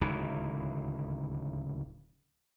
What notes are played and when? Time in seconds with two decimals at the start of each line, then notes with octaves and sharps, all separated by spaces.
0.01 D1 C#2 D#3 E3